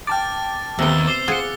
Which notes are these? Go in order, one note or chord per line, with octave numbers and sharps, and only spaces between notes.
G5 A5 D6 F6 A6
D#2 C3 B3 E6 G7
C5 D6
F4 G#4 F#5 C#7 G7